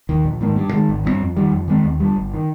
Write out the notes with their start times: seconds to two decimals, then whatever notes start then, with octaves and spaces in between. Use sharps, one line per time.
0.09 D#2 D#3
0.24 A#1
0.41 G#2 D#3 A#3
0.56 G2
0.72 D#3 G#3
0.89 G#1
1.05 G2 F3 C4
1.21 F2
1.36 D#3 G3
1.52 F2
1.68 D#3 G#3 C4
1.84 D#2
2.00 D3 G3
2.16 G1
2.34 D#3